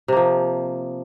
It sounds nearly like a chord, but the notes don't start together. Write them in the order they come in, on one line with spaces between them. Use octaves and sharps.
C3 A#3 F3